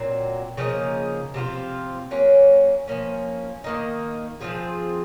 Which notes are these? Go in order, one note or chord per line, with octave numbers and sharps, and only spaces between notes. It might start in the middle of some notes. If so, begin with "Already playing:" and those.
Already playing: A#2 F#3 C4
C#3 F3 A#3 D#4
C3 F3 C4 F4
F#3 A#3 C#4
F3 A#3 C#4
D#3 A#3 D#4
F3 C4 F4 G#4